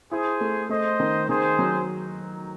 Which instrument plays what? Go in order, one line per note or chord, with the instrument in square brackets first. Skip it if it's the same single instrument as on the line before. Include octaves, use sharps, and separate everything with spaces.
[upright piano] E4 [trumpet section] G#4 C5
[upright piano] A3
[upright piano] A3 [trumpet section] C5 D#5
[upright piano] D#3
[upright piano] D#3 [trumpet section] G#4 C5
[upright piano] F#3